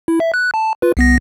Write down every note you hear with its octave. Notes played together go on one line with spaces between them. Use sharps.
E4
E5
F#6
A5
F4 B4
C2 B3 A#6